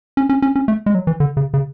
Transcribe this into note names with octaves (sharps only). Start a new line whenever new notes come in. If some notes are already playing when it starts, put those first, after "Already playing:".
C#4
C#4
C#4
C#4
A3
G#3
F#3
E3
D3
C#3
C#3